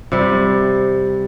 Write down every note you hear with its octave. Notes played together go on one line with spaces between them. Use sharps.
C3 G3